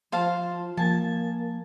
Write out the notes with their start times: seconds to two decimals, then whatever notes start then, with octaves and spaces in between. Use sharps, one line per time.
0.12 F3 C5 F5 A5
0.77 F3 A#3 G#5 A5 A6